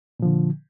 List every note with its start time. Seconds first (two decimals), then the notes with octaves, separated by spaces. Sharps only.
0.20 A#2
0.22 F3
0.25 D3